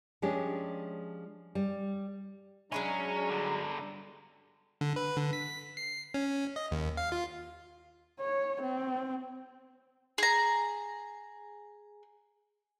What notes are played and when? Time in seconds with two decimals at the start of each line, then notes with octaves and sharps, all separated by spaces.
0.22 F3 G#3 C#4 D4 G4
1.55 G3
2.72 F#3 G#3 C#4 D4 E4 A#5
3.29 G2 D3
4.81 D3
4.96 B4
5.17 D3
5.33 B6
5.77 C7
6.14 C#4
6.56 D#5
6.71 D#2
6.97 F5
7.12 F4
8.20 C#5
8.62 C4
10.18 G#4 A#5